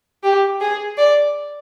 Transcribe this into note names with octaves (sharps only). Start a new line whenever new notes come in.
G4
G#4
D5